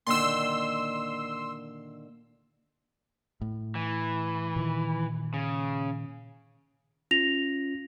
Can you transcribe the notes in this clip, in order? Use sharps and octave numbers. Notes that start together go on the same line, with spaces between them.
A#2 D3 D#3 C6 E6
A2
E3
A#2 D#3
C#3
C#4 F4 A#6 F7